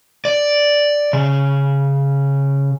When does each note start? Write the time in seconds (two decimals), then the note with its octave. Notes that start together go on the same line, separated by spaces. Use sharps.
0.25 D5
1.13 C#3